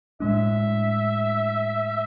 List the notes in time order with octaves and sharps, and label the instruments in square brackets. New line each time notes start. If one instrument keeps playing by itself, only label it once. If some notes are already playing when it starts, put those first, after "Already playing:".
[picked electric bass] A2 G#3 D4 [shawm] E5